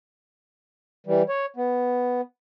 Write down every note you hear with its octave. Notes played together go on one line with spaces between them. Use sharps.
E3 G3
C#5
B3